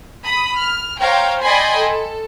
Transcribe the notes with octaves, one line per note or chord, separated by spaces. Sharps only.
B5 D#6
F6
C5 C#5 F5 G5 A#5
D5 D#5 G5 G#5 B5 C6
A4